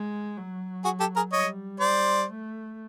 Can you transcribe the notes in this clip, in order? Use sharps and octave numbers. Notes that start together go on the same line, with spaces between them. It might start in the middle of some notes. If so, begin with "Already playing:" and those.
Already playing: G#3
F#3
F#4 G#4
G4 A4
G#4 A#4
G3 C#5 D#5
C5 D5
A3